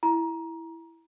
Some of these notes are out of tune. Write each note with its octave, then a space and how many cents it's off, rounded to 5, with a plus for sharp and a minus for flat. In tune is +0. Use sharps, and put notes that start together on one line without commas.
E4 +0 A#5 +20